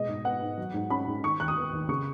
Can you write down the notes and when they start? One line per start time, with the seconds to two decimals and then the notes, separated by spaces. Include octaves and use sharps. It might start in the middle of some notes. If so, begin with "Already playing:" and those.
Already playing: B2 G#3 D#5
0.08 G#2
0.25 B3 F#5
0.41 G#2
0.58 F#3
0.74 G#2
0.90 C#4 B5
1.07 G#2
1.23 D#3 C#6
1.40 D#2 F#6
1.48 D#6
1.56 B3
1.73 D#2
1.89 C#3 C#6